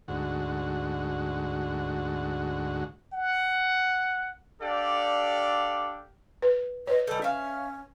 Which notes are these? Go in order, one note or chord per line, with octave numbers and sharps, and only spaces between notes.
D2 G#2 F#4
F#5
D4 G4 A4 D5 F5
B4
B4 C#5 D#5
G3 D#4 A4
C#4 E5 F5